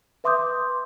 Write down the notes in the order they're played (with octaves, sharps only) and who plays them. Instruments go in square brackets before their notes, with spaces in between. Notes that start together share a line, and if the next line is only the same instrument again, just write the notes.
[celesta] B4 E5 C6 D6 D#6 G6